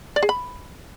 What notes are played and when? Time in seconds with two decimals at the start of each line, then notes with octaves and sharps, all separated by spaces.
0.16 D5
0.23 G#4
0.29 B5